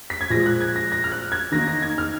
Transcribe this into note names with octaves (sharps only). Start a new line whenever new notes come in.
B6
G#6
A#2 F3 G#3 A#6
F#6
G#6
A#6
A#6
F6
F#6
G#6
D#3 A#3 D#4 A#6
A#6
G#6
F6